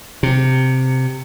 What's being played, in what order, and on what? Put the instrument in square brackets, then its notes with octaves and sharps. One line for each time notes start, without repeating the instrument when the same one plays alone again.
[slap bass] C3